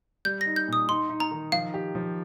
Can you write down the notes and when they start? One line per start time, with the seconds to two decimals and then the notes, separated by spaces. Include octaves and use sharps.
0.25 G3 G6
0.41 A#6
0.46 D#4
0.56 G6
0.68 A#2 D#6
0.88 D#4 C6
1.10 D#4
1.20 A#5
1.31 D#3
1.52 F3 F5
1.74 G4
1.95 F3